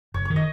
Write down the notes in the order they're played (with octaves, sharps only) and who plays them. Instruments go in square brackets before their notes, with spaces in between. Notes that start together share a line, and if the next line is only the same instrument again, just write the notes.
[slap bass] F#1 [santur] C#5
[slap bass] D#3 [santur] C#5
[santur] D#5